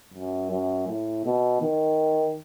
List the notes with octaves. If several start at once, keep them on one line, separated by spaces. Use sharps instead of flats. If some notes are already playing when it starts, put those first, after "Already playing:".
F#2
F#2
A2
B2
D#3